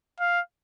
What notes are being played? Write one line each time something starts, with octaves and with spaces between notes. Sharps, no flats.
F5